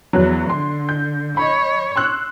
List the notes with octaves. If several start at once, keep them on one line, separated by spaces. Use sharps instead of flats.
E2 F#3 B3 F#6
D3 C6
G6
C#5 D#5 B5
C6 E6 F#6